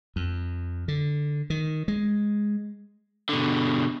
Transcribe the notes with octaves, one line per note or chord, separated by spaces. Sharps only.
F2
D3
D#3
G#3
B2 D3